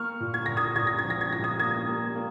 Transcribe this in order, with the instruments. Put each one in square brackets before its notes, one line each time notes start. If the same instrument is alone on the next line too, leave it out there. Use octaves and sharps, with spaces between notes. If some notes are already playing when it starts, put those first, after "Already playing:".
Already playing: [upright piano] A#3 C#6 F6
A#2
G#6
A#2 A#6
D#6 G#6
A#2 G#6
A#6
G#6
F3
A#6
G#6
A#2 A#6
D#6 G#6
A#3 D#6 G#6
A#3
A#3